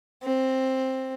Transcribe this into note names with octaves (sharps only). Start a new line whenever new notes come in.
C4